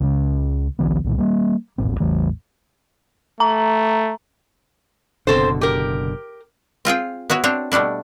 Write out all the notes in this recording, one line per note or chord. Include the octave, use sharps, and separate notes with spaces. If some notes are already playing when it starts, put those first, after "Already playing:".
C#2 C#3
B1 D3 E3 B3
C2 A#2 D#3
G3 A#3
D#1 A1 C4
A1 E2 E3 A3
A3 A#5
F#1 B2 D3 C4 A4 C5
G4 A#4
C4 F4 G#4 G5
B3 E4 F#4 C#5
C4 D4 C5 C#5
B2 G3 A3 D4 E4